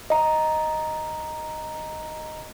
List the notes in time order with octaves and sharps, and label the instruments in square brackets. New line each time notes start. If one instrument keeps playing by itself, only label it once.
[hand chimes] D#5 A#5